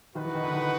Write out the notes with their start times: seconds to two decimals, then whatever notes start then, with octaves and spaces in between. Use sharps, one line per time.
0.15 D#3 D#4 F#4 B4
0.25 E3
0.35 D#3
0.44 D3
0.53 D#3